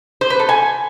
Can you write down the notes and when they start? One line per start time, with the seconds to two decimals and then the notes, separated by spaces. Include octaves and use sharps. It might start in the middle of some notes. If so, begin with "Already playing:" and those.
0.21 C5
0.30 B4
0.40 A4
0.49 G#5